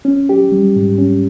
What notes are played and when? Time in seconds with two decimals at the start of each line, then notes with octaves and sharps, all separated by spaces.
0.05 C#4
0.29 G4
0.52 G3
0.76 G#2
0.98 C#4